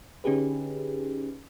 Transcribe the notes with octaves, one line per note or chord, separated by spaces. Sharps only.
D3 C#4 D#4 G4 G#4 B4